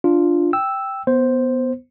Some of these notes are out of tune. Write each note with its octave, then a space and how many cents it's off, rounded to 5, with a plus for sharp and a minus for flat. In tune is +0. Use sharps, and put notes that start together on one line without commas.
D4 +0 F4 +0
G5 +0 E6 +0
B3 +0 C5 +0